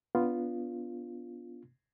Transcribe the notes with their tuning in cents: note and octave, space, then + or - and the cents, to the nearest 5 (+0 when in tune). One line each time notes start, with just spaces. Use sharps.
B3 -10 D4 -25 F4 +0